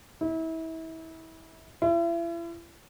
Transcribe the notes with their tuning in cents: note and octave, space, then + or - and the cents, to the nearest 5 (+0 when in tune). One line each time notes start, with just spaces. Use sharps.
E4 -30
E4 +40